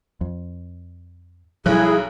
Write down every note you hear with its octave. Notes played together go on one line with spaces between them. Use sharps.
F2
B1 F3 G3 E4 G#4 F#6